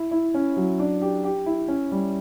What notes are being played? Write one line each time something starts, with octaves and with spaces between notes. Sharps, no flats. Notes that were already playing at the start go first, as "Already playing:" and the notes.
Already playing: E4
E4
C#4
F#3
D4
G4
G4
E4
C#4
G3